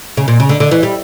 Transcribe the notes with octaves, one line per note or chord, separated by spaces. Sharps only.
C#3
A#2
C#3
D3
D3
E3
G3